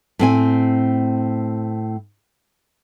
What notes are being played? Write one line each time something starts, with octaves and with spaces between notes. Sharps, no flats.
A2 C4 G#5